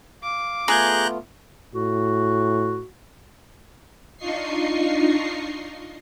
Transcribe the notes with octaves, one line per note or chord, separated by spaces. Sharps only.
F5 D6
A3 B3 F4 G#4 A#5 F#6 G6
A2 F#4
D4 D#4 F4 D#5 C#6 C7